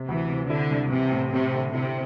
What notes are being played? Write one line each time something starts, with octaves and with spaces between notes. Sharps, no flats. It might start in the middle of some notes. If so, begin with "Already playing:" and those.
Already playing: C3
D2 E3
C3
D3 E4
C2
C3 E3
A2
C3 C5
D3
C3 E4